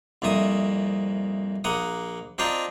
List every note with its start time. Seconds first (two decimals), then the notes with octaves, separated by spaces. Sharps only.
0.22 C2 F2 A#2 E5 D#6
1.64 A#1 A#3 F#5 D#6
2.38 C4 D4 F4 D#5 G5 A#5